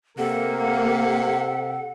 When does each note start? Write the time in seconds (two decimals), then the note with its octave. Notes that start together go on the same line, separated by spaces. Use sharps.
0.18 C3 A#3 A4 F#5